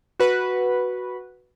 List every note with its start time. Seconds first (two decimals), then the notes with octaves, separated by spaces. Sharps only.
0.20 F#4 B4